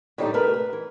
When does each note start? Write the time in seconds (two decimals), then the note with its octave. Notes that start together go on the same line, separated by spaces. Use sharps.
0.18 A2 D3 G3 A3 D#4 G4
0.34 C3 A3 A#4 B4
0.54 B4
0.73 E3